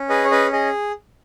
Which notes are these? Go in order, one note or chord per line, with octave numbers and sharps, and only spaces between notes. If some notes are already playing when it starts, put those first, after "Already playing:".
Already playing: C#4
G#4 B4 D#5
C#5
C#4 B4 D#5
G#4 D#5